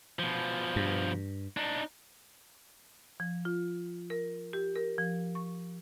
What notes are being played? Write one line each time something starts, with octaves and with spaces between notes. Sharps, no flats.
B2 F3
G2
D4 D#4
F3
F4
A#4
G4
A#4
F3
C#6